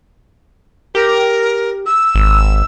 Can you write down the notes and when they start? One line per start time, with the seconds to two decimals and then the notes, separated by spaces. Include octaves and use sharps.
0.95 G4 A#4
1.86 E6
2.15 G#1